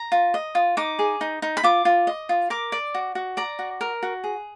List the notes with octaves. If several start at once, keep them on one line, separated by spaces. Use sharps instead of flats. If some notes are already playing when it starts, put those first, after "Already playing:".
Already playing: A#5
F4
D#5
F4
D#4 D6
G#4
D#4
D#4
B5
F4 D6
F4
D#5
F4
A#4 D6
D5
F#4
F#4
D5 A#5
F#4
A#4
F#4
G#4